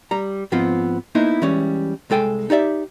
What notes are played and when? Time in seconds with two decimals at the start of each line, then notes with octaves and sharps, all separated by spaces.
0.11 G3 A#5
0.52 G#2 F3 B3 C4 F4
1.15 A#3 B3 D#4 E4 C5
1.42 E3 G3 G#3 C#4
2.10 C2 G#3 A4 G5 G#5
2.50 D#4 G4 D5 E5